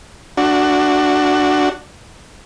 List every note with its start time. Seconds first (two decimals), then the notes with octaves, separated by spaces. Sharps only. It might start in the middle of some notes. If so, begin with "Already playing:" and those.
0.37 D4 F#4